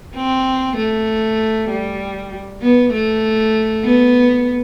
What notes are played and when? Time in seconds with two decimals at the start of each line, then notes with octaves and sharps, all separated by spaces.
0.16 C4
0.77 A3
1.70 G3
2.62 B3
2.93 A3
3.84 B3